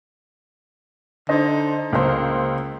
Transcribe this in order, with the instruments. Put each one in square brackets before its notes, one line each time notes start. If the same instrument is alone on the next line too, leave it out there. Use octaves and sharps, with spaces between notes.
[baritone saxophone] D3 [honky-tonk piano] D#4 C5 D#5
[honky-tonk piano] C#2 C5 [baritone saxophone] A#3